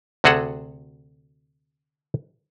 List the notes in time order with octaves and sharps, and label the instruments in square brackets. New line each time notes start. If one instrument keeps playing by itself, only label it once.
[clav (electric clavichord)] D2 C3 F#4 G#4 A4 F#5